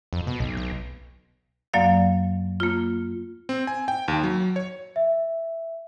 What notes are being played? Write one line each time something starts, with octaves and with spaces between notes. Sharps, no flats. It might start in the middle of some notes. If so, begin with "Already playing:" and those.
F2
B2
B1
B1
F#2 F#3 A#3 D5 F5 A6
A#3 F4
C4
G#5
G5
D#2
F#3
C#5
E5